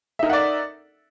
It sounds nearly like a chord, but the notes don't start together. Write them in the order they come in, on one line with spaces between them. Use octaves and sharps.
E5 D#4 A#4 F#5 D5